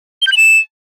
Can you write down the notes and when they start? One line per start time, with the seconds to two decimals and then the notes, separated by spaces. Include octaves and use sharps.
0.22 G7
0.27 G6
0.32 F#7
0.37 E7